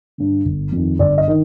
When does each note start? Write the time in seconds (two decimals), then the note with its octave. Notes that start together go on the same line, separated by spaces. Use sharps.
0.18 G2 D3
0.45 G1
0.72 F2 D#3
0.99 G1 D5
1.18 D#5
1.28 D#3